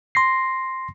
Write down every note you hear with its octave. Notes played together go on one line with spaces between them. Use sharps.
C6 A#6 C7